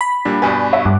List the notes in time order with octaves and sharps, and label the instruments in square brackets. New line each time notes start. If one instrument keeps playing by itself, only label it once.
[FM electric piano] B5
[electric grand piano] A#2 G3 D4
[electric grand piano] G2 B2 B4 [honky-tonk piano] D5 G#5
[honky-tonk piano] C#5 E5
[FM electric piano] G2 [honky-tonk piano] D6 F#6